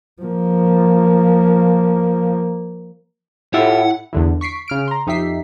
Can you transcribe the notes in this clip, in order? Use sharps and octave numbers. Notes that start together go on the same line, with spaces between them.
F3 A#3
A2 E4 F4 G4 E5 F#5
E2 D3 E3
C#6 B6 C7 D7
C#3 F6 D7
A#5 C6
F2 D#4 G4 E5 B6 C7